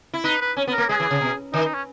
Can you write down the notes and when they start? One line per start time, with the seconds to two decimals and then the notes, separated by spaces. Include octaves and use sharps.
0.13 E4
0.24 D#4 B4
0.41 B4
0.57 C#4
0.67 B3
0.73 A#4
0.78 A#3
0.89 G#3 G#4
1.00 E3
1.11 C#3
1.21 B2
1.53 D#3 D#4
1.64 D#4
1.74 C#4